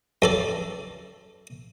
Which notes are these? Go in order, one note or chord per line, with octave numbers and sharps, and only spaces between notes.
F#2 A4 D5